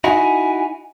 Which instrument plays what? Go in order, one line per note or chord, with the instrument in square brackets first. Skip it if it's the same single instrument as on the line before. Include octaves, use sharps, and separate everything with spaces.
[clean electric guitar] D#4 E4 F#4 [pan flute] G#5